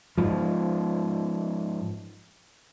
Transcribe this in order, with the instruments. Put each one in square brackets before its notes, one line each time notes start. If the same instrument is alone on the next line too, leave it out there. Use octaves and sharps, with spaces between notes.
[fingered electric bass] G#2 F3